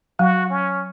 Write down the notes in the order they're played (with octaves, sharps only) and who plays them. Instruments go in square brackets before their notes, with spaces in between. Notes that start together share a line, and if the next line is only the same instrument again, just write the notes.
[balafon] F#3 [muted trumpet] F#4
[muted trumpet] C#4